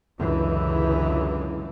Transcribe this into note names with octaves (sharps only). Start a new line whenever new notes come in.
C#2 F#2 D3 E3